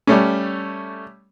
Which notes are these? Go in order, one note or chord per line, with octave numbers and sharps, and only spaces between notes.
G3 A3 C#4